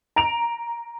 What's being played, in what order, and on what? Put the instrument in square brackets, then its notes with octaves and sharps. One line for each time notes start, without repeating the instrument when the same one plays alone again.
[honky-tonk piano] A#5 D7 F7